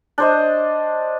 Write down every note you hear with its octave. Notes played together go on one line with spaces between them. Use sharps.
D4 C5 D#5